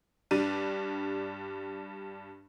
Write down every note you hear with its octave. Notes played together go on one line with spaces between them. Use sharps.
G2 G3 D4 D#7